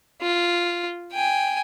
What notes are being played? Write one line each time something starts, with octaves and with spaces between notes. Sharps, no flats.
F4
G5 G#5